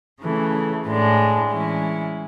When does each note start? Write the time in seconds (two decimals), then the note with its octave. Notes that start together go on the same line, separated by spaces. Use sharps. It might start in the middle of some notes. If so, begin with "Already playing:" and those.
0.21 C#3 E3 A3
0.86 A2 G#3 D4
1.51 E3 G#3 C#4 E4